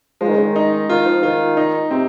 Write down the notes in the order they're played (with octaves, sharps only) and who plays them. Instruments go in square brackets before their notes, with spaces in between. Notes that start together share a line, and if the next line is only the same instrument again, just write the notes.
[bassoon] F3 [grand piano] G#3
[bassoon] D#3
C#3
D#3
[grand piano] D#4
[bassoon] D#3 [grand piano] F4
[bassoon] F3
[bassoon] D#3 [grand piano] F4
[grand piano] D#4
[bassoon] C3 [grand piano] C4